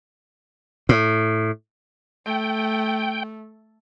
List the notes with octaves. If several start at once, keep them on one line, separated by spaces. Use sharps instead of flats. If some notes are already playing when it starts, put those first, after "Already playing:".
A2
A3 G5